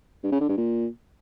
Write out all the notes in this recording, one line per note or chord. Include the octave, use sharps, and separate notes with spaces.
G2
C#3
D3
G2
A#2